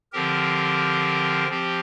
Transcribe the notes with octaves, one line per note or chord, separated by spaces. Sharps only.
D3 F3 C4 G4 A#4
F3 C4 G4